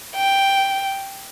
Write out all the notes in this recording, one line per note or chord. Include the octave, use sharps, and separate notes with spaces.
G5